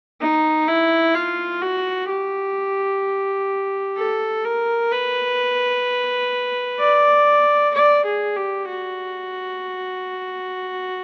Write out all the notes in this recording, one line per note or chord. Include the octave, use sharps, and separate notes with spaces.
D#4
E4
F4
F#4
G4
A4
A#4
B4
D5
D5
G#4
G4
F#4